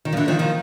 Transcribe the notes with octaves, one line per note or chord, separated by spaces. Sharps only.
D#3
F3
D3 E3
D#3 F3
D#3 F3